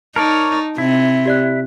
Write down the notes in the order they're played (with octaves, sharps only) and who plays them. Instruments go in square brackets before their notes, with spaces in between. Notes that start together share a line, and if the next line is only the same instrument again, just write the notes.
[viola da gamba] D#4 [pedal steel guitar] A#4 C#5 D5 [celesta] A5 D7 F7
[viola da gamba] C3 [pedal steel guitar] E4
[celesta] G4 D5 F#6